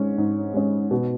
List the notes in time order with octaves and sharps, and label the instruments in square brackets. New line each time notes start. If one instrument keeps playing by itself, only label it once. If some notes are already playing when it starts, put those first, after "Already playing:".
Already playing: [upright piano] G#2 G#3 C#4
G#2
G#3 C#4
B2